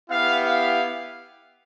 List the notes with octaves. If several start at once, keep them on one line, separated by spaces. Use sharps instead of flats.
B3 E4 G4 F5
F5